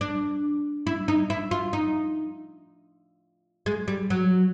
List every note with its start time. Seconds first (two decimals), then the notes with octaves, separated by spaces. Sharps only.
0.01 D4
0.87 E4
1.08 D#4
1.30 E4
1.51 F4
1.73 D#4
3.66 G#3
3.88 G3
4.10 F#3